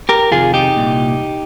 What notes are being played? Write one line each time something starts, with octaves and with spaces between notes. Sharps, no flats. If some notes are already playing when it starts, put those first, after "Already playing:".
G4 A#4
F2 C3 D#3 F4 G#4
D#4 G4
C2 A#2